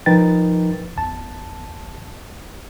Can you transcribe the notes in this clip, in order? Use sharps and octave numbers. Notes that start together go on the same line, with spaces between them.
F3 D#4 A#4 B4 G5 A6
G1 E2 A5